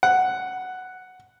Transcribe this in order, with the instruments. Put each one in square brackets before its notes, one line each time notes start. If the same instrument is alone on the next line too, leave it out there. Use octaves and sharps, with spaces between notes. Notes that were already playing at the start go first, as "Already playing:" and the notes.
[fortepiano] F#5